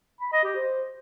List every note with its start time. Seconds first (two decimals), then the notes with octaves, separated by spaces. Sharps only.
0.21 B5
0.32 D#5
0.44 G4
0.56 C5